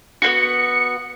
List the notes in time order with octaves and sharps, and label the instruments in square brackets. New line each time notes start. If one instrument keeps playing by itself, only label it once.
[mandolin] B3 C4 F#4 [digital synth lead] C#7